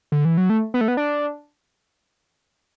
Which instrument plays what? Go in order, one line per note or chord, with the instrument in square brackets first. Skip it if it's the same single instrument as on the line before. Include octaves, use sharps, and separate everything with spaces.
[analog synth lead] D3
E3
F#3
A3
B3
A3
B3
D4